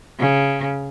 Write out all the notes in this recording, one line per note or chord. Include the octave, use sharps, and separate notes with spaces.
C#3